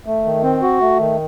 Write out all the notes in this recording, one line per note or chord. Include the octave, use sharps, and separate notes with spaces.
A3
D#3
C4
F#4
A3
D#3